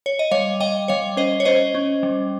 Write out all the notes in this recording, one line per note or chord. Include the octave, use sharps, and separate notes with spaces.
C#5
D#5
G3 C#5 F5
G3 D#5 G5
G3 C#5 F5
C#4 C5 D#5
C#5
C#4 C5 D#5
C#4
G3